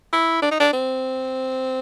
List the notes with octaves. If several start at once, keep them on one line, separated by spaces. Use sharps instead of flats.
E4
D4
D#4
D4
C4